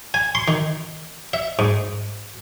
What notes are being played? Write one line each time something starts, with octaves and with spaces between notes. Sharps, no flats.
G#5
C6
D#3
E5
G#2